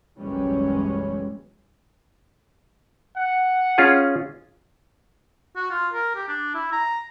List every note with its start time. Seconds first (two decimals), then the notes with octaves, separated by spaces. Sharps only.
0.19 F#1 B1 E3 G3 G#3 C#4
3.18 F#5
3.78 C#4 F4 G#4
5.56 F#4
5.70 F4
5.93 A#4
6.16 G4
6.28 D4
6.55 E4
6.72 A#5